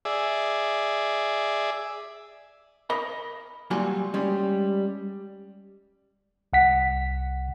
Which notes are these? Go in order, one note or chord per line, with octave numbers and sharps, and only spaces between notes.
G#4 D5 E5
A#4 D#5 B5
A#2 F#3 G3 F#4 G#5 C6
G3 G#3 C#4
C2 F#5 B6